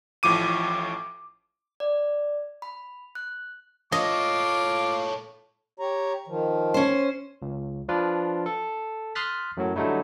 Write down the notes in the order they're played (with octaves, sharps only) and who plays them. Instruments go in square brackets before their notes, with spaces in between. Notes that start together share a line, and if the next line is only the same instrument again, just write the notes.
[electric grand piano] A1 A2 F3 D6 D#7
[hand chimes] D5
B5
F#6
[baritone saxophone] F4 [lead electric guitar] A4 C#5 [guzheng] D#5 [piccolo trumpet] D6
[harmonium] G4 C#5 A#5
D#3 F3
[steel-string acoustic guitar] C#4 C5
[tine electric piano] C#2
F3 D4 F4 B4
A4
C6 D#6 F6 F#6 A6 B6
F#2 A2 F#3
D3 F#3 G3 A3 D#4 E4